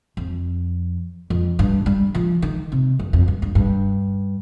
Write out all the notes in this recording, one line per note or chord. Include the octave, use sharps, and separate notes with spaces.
F2
F2
G2
G3
F3
D#3
C3
G2
F2
G2
G2
G2